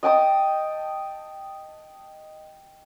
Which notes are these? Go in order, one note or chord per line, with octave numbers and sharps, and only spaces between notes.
D#5 G5 A5 D#6